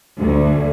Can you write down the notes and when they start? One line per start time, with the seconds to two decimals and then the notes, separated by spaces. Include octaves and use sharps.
0.19 D2